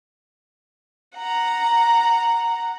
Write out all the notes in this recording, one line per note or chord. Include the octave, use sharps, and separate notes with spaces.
F#5 A#5